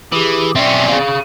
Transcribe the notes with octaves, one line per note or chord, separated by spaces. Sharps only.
E3 G4 G#4
B1 C4 C#4 D5 E5
G#4 F5